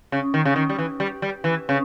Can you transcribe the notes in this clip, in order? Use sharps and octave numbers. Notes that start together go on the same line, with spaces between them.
C#3
D#3
C#3
D#3
G3
E3
G3
G3
E3
C#3